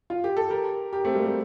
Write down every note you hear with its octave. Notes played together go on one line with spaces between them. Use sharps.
F4
G4
A4
G4 A#4
G4 A#4
A3 C4
G3 A#3
C4
G3 A#3